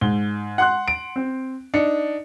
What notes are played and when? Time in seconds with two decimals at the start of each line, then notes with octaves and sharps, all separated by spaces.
0.01 G#2 G7
0.58 F#5 C6 F#6
0.88 D7
1.16 C4
1.74 D4 D#4 C#7